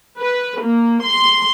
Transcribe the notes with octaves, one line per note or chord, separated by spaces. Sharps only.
B4
A#3
C6